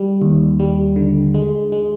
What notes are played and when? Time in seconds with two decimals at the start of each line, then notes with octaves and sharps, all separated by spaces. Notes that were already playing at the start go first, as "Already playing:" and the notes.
Already playing: G3
0.22 D#2
0.60 G3
0.96 D3
1.34 G#3
1.72 G#3